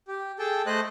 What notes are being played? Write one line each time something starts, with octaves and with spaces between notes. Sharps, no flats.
G4
G#4 A4 G5 A5
A3 C5 D#5 F#6